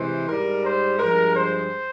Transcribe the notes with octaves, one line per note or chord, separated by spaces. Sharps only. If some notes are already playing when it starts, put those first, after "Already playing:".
Already playing: C3 E3 G#3 C5
G#2 G3 A#4
C5
G2 F3 G#3 A#4
C5